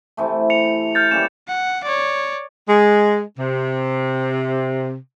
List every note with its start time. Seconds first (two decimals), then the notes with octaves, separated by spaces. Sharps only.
0.17 C3 E3 A3
0.50 C#7 F7
0.95 F6 G6 A6
1.11 G3 A#3 C#4 E7
1.48 F#5
1.84 C#5 D5
2.67 G#3
3.38 C3